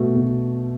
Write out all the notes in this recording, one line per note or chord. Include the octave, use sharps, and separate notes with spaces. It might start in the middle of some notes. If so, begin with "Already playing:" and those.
Already playing: B2 A3
B2